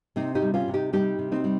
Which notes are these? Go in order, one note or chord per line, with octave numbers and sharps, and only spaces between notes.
C3 C4 D#4
D#4 G4
G3
C#4 F4
C3
D#4 G4
G3 D#4 G4
C3
C4 D#4
G3